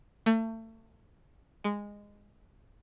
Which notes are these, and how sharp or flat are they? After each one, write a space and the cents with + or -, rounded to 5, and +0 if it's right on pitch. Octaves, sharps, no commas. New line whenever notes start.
A3 +30
G#3 -15